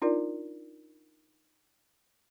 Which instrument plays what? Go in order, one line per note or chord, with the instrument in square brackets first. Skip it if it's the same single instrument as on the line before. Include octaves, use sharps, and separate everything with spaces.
[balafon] D4 D#4 F4 A#4 D5